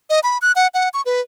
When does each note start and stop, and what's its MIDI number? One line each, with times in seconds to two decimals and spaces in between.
0.10 0.20 75
0.23 0.38 83
0.42 0.52 90
0.56 0.67 78
0.74 0.89 78
0.94 1.02 85
1.06 1.21 71